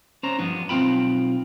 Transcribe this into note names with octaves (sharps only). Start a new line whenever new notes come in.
C#4 C5 A#5
G2 F3 B3 D4
B1 F3 C4 F4 G5 B5